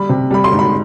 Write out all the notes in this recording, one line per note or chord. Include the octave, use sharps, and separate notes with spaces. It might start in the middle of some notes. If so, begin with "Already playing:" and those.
Already playing: G3 B5
C3
G3 B5
C6
G#2
B5